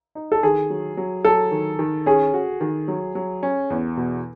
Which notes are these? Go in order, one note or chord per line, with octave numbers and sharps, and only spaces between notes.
D#4
A4
D#3 G#4
F#3
F#3
F#3 A4
D#3
D#3
C#4 G#4
F#4
D#3
F#3
F#3
C#4
E2
B2